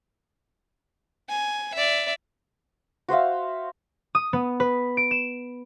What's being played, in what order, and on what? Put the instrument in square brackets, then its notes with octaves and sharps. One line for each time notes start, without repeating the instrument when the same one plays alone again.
[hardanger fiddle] G#5
D5 E5
[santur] F#4 C5 E5 F5
[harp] D#6
B3
B4
D7
E7